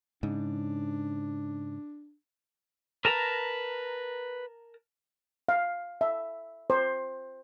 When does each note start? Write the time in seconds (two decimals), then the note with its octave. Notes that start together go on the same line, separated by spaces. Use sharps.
0.23 G#2 C#3 D4
3.05 A#4 B4 A5 A#5
5.49 F5
6.01 E5
6.70 C5